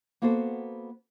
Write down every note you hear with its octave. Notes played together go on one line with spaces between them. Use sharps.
A#3 B3 F#4 A4 C5